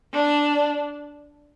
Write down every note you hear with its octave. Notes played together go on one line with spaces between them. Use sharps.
D4